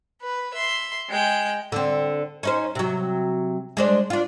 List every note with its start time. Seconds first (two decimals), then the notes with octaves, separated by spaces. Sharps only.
0.21 B4
0.54 E5 C6
1.10 G#3 G5
1.72 D3 C4
2.43 C#4 D#4 C5
2.75 C3 F#3
3.77 G#3 D4 C5
4.10 D4 F4